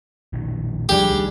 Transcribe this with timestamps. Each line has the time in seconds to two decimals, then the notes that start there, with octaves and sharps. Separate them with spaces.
0.33 A#1 B2 D#3
0.89 C2 F3 G3 D4 G4 G#4
1.10 C#2 D#3